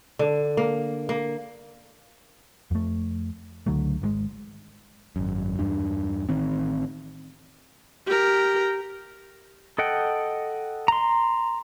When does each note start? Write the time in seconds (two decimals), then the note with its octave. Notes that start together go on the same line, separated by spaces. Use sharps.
0.19 D3
0.57 A#3
1.09 A#3
2.71 F2 A3
3.67 C#2 D3 F#3 A3
4.02 G#1 D3 G#3
5.16 G#1 F#2
5.59 E2 G2 D4
6.29 A1 D#3 C4
8.07 G4 A#4
9.78 A4 D#5 F#5 G5
10.88 A#5 C6